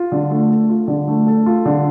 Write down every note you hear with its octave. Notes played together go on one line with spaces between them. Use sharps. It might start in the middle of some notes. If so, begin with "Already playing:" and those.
Already playing: F4
D3
A3
A4
F4
D3
A3
A4
F4
D3